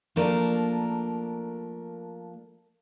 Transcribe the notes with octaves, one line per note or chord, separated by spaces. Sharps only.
F3 A3 A#3 D4 A#4